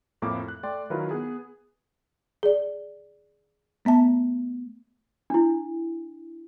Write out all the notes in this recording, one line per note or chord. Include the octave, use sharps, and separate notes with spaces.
F2 A2 A#3 D6
F#6
A3 D5 G5 C6
D#3 F#3 E4 F4 A#4 B4
B3 G#4
G#4 D5
A3 B3 E5 A5
D4 E4